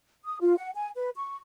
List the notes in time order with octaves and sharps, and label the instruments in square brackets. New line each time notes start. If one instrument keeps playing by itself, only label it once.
[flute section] D#6
F4
F#5
G#5
B4
C#6